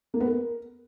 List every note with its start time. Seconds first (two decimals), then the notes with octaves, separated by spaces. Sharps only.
0.14 A#3
0.20 B3
0.27 A#4